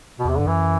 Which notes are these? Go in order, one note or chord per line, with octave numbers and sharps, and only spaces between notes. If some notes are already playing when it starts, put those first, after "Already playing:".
B2
E2 C3
G2 D3
F#2 E3